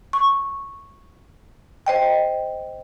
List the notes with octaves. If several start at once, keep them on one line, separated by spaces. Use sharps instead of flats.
C#6
C5 D#5 G5